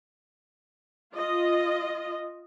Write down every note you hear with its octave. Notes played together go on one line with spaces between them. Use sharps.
F4 D#5